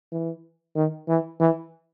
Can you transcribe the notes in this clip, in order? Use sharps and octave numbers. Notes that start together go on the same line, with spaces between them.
E3
D#3
E3
E3